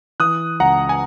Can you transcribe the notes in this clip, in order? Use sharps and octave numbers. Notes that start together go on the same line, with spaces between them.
E3 D#6 F#6
C#2 F#5 A#5
G#5